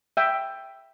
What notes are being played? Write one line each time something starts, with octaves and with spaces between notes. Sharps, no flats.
E5 G5